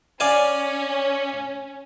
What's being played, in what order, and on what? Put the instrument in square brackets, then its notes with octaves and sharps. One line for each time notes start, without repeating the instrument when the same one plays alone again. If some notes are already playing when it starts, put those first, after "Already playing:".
[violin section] C#4 [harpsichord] D5 F5 G#5